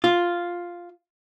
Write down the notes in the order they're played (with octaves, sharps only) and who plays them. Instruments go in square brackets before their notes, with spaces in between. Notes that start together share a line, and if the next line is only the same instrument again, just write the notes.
[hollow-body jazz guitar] F4